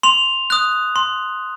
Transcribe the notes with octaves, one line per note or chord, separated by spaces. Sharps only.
C6 F7
D#6 F#6
C6